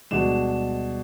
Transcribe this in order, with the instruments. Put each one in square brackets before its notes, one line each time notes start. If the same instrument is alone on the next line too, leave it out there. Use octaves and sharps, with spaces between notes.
[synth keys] D2 G3 G#3 [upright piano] B2 D4 E7